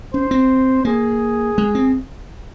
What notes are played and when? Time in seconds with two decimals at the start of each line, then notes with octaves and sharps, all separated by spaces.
0.14 C#4 C5
0.31 C4
0.85 A#3 G#4
1.58 G#3
1.75 C4